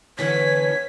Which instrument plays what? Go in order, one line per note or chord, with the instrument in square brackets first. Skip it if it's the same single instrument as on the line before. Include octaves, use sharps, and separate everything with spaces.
[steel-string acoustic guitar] D3 E3 B3 [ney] C#5 [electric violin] B6